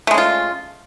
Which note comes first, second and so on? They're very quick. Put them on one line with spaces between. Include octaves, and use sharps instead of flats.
A3 G#3 C#4 F4